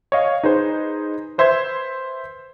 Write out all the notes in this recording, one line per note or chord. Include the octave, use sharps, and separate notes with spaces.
C#5 D#5 F5
D#4 G#4 B4 C5
B4 C5 E5 C6 G#6